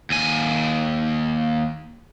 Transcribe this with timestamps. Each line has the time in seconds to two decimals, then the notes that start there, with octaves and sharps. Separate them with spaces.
0.10 D#2 G#5